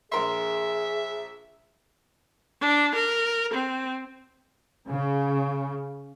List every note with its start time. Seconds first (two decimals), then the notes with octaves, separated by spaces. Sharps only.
0.12 A#1 G#4 A#4 E5 C6
2.61 D4
2.95 A#4
3.54 C4
4.88 C#3